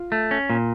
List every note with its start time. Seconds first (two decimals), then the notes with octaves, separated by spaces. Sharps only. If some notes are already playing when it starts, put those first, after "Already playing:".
Already playing: F4
0.12 A3
0.31 C#4
0.50 A#2